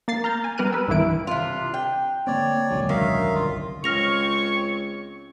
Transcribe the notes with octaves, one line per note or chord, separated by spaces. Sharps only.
A#3 A6 C7
A#5 F6 G6 A6
G#5
G3 B3 A#4 F6 F#6 D#7
B4 E6
C2 G2 D#3 E3 E4 D7
C3 D4 F4 F5
G5
D3 A#3 C4 C#5 D5
E1 C#2 F#2 D3 F#3 G#3
D#3 E5 F5
G1 C2 F4
C#2 C4 C#5 C#6 F6 A#6 F7